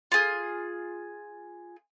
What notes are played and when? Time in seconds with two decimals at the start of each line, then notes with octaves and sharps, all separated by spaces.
0.12 F4 G#4